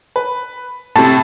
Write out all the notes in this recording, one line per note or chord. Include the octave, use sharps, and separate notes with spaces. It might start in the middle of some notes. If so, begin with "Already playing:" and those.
B4
A2 C3 A5